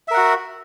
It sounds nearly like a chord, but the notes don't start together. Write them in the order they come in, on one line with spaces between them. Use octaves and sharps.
E5 A#4 F#5 F#4